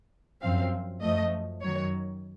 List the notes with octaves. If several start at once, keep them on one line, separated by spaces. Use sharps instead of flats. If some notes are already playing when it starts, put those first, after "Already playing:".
F#2 F3 C4 F5
F#2 F3 A3 D#5
F#2 D#3 F#3 C#5